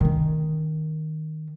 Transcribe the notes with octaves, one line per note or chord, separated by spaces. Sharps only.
D#3 C#4